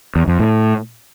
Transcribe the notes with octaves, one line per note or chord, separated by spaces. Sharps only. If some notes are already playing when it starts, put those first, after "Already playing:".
E2
F2
A2